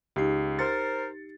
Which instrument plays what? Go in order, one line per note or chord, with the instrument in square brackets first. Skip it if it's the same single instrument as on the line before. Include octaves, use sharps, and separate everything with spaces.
[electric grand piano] C#2 C7 [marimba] D#4 G4
[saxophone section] A#4 C5 [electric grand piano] A6 C#7